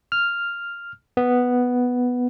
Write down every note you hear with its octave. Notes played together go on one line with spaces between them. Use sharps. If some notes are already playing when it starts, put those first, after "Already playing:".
F6
B3